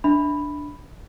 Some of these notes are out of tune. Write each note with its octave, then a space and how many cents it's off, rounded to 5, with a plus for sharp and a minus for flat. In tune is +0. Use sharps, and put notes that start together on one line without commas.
D4 +0 E5 -25 B5 +0